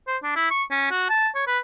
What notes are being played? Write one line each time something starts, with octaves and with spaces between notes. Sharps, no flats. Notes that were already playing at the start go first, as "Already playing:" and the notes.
C5
D4
E4
C#6
C#4
F#4
A5
C#5
B4